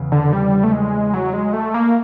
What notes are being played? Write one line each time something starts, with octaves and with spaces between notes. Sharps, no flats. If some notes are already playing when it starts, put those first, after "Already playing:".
Already playing: E2 C#3
D3
G3
A3
G#3
F#3
G#3
A3
A#3